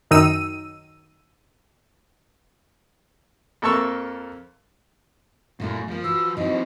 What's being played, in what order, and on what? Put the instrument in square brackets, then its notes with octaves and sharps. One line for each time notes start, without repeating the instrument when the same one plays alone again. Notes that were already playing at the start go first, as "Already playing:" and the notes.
[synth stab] F#2 D#3 D#4 E6 D#7
[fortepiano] F2 A#3 A4 A5 C#6 E6
[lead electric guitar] F#2 [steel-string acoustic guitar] A#2 A3 E4
[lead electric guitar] F3 [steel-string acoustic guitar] G#3 A#3
[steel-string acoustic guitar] E3 F#4 [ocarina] E6
[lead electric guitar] E3 C4 [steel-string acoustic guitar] F#3 D#4 [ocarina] D#5